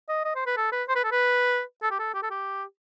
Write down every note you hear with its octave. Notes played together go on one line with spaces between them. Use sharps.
D#5
D#5
C5
B4
A4
B4
C5
B4
A4
B4
A4
G4
A4
G4
A4
G4